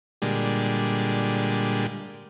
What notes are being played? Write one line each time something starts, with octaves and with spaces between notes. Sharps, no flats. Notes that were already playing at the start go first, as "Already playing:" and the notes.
A#2 D3 G3 G#3